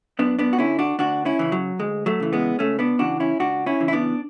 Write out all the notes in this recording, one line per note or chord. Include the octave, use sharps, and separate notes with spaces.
F#2 B3 D4
B3 D4
F#4
D3 C#4 E4
D4 F#4
D2 D4 F#4
C#4 E4
C#3 E3
F#3
D2 G#3
F#3 A3
C#3 E3
G#3 B3
C#2 A3 C#4
B3 D4
C#3 E3 D4 F#4
C#4 E4
C#2 D4 F#4
C#4 E4
C#3 E3
E4
B3 D4